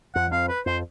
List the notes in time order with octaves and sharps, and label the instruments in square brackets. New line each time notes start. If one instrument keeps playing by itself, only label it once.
[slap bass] F2 F3 [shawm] F#5
[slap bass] F2 F3 [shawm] F5
[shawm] B4
[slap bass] F2 F3 [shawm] C5